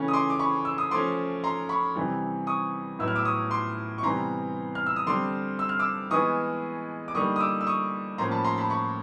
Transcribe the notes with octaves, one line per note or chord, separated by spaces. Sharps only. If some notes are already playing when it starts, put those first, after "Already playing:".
Already playing: C#3 E3 A3 C#4
D#6
C6 D6
D6
B5 C#6
E6
D#6
F3 A3 C#4 C6 D6
A#5 C6
B5 C#6
C3 E3 G3
C#6 D#6
A2 F#3 B3 E4 E6
F6
D6 E6
C#6 D#6
C6 D6
C#6
C3 E3 G3 B3 A#5 C6
F6
E6
D#6
D3 G3 C4 C6 D6
E6
F6
D6 E6
E3 G#3 B3 C#6 D#6
D6
D3 G3 A#3 D#4 C#6 D#6
D#6
D6 E6
E6
C#6 D#6
A2 F3 A#3 C#4 A#5 C6
A5 B5
A#5 C6
A5 B5
B5 C#6